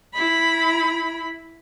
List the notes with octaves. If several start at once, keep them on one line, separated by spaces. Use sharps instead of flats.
E4 B5